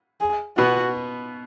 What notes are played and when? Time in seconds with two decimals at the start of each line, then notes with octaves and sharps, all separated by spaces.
0.21 G#4
0.58 B2 B3 F#4